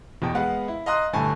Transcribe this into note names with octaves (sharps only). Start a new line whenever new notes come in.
E2 B2 G5
G#3 B3 B4 F5 F#5
E4
D#5 F5 A#5 C6 D#6 F#6
G1 A2 A4 G#5 A5 C#6